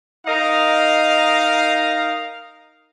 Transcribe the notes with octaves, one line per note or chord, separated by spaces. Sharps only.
D#4 A#4 D#5 F5